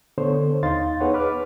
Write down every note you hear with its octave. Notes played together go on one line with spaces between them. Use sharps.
D3 B3 A4 C5 C#5
D#2 D#4 F5 C6 A6
B3 D#4 G#4 B4 C#5 F#5
B4 D6 F6